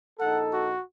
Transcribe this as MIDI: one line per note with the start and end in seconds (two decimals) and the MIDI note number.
0.20 0.72 34
0.20 0.72 63
0.20 0.72 69
0.20 0.42 78
0.53 0.83 66